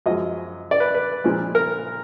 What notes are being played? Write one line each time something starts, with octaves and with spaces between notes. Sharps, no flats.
F#2 F3 G#3 D#5
D5
B4
B4
A#2 F3 G#3
A#4